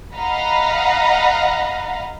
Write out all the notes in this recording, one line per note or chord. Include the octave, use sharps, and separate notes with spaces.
D#5 F5 F#5 A#5 B5